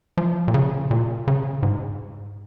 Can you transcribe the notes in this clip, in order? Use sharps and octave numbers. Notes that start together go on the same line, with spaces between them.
F3
A#2
C#3
A#2
C#3
G#2